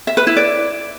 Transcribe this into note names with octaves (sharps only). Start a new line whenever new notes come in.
E5
B4
E4
D5